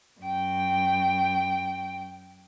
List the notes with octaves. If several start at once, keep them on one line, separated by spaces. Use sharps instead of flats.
F#2 G5